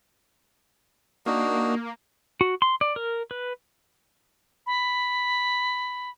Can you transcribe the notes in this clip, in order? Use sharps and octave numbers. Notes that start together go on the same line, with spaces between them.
A#3 D4 D#4 F#4
F#4
C6
D5
A#4
B4
B5